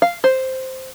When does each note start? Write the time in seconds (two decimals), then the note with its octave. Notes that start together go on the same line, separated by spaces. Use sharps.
0.02 F5
0.24 C5